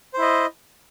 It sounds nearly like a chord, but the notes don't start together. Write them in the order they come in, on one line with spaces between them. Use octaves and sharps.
C5 E4 D#5